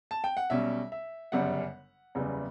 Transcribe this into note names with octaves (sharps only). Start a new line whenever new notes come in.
A5
G5
F#5
B1 B2 G3 C#4 E5
E5
G1 F#2 C#3 G3 F#5
F#1 E2 C#3 G3 B3